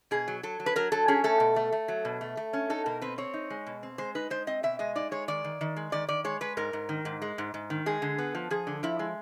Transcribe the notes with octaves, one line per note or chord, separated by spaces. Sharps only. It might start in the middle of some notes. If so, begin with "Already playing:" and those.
B2 G#4
F#3
F#3 A4
F#3
B4
F#3 A#4
F#3 A4
C#4 G#4
A3 A4
B2
A3
A3
F#3
B2
A3
A3
C#4
D#4 A4
B2 A#4
C4 B4
C4 C#5
D#4
G#3
B2
C4
G#3 C5
D#4 B4
G#3 C5
C4 D#5
B2 E5
G#3 D#5
D#4 D5
G#3 C#5
D#3 D5
D#3
D#3
G#3
D#3 D5
D#3 D5
G#3 C#5
G#3 B4
G#2 A#4
G#2
D#3
G#2
G#3
G#2
G#2
D#3
G#3 G#4
D3
B3
F3
F3 G#4
D3
F3 E4
G#3